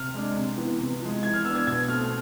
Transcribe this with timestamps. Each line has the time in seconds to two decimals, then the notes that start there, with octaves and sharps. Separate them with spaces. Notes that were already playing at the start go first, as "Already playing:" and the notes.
Already playing: C3 F6
0.14 G#3 D4
0.36 C3
0.57 E3 B3
0.79 C3
1.01 F3 G#3
1.23 E3 G#6
1.34 F6
1.45 B3 D4 E6
1.55 G#6
1.67 B2 G#6
1.88 A3 C4 F6